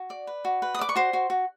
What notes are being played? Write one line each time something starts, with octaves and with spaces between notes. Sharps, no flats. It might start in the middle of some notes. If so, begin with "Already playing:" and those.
Already playing: F#4
D5
B4
F#4
B4
D#6
D5 D6
C#6
F#4 C5 C6
F#4
F#4